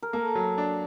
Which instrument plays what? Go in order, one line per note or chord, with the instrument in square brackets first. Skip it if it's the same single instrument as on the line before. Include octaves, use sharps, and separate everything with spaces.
[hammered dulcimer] A#4
[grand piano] A#3 [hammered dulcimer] A4
[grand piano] F#3
D4